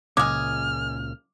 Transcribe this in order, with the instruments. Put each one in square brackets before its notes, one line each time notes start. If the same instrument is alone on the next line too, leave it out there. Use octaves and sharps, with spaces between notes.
[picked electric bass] C#2 A#2 C#3 [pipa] G#3 G#4 [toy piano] D6 [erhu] F6